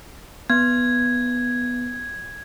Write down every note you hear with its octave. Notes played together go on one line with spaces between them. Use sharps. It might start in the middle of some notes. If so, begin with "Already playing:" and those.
B3 G#6